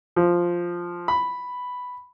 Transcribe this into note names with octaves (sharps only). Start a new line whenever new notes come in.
F3
B5